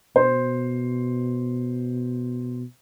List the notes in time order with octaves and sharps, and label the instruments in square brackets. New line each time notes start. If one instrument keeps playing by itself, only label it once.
[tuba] B2 [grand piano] C5